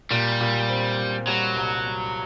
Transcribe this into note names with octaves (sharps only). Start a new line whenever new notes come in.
A#2 G3
A#2
C4
A#2
F#3 G3
C2
G3